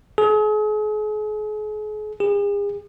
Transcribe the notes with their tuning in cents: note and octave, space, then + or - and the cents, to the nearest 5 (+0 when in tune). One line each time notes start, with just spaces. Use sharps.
G#4 +40
G#4 -40